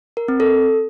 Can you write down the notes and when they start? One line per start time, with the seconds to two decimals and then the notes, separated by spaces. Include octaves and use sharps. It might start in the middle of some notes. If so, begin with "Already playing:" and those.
0.17 A#4
0.28 C4
0.40 A4